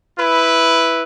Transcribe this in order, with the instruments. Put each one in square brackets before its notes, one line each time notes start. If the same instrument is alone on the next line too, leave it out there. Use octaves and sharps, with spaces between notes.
[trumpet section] E4 B4